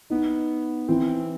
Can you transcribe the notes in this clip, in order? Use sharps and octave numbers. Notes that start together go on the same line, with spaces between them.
B3 D#4
E3 C4
C4